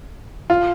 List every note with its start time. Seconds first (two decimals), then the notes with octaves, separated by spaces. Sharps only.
0.50 F4